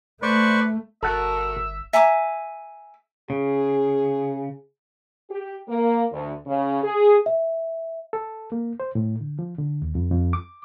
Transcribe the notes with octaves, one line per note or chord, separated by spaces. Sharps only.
A3 B4 C5 D5 C#6
G1 F#4 A4 A#4 E5 F#5
E5 G#5 A#5 D6
C#3 G#4
G4
A#3
D2
C#3
G#4
E5
A4
A#3
C5
A2
D3
F3
D3
D#2
F2
F2
D6